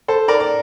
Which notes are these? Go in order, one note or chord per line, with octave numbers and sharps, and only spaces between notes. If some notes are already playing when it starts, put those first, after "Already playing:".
A4 C5
A#4 D5
D5